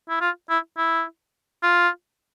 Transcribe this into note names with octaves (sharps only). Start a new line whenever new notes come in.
E4
F4
E4
E4
F4